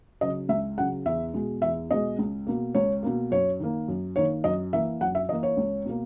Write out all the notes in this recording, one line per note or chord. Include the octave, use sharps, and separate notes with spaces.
C#3 F#3 D#5
C#2 E5
C#3 F#3 F#5
E2 E5
B2 G#3
E2 E5
B2 G#3 D#5
C#2
B2 A#3
C#2 C#5
B2 A#3
F#2 C#5
D#3 A#3
F#2
D#3 A#3 C#5
F#2 D#5
E3 A#3 E5
F#2 F#5
E5
E3 A#3 D#5
C#5
C#2
B2 A#3